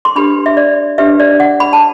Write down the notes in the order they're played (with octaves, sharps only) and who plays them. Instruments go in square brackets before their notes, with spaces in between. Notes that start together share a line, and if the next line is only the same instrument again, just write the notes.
[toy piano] C6
D4 G4 B4 B5
E5
D5
D4 G4 B4 E5
D5
F#5
B5
A5